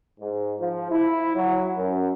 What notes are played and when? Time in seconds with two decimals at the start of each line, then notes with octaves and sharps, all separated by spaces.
0.20 G#2
0.59 F3
0.91 E4
1.35 F#3
1.76 F#2